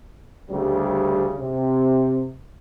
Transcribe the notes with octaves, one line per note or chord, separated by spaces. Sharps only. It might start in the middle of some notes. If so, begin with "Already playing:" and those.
D2 C#3 G3
C3